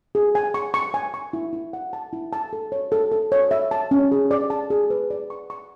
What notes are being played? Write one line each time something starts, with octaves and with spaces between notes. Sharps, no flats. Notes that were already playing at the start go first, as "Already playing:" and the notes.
G#4
G#5
C#6
C#6
G#5
C#6
E4
E4
F#5
A5
E4
A5
A4
C#5
A4
A4
C#5
E5
A5
C#4
G#4
D5
A5
G#4
B4
D5
C#6
C#6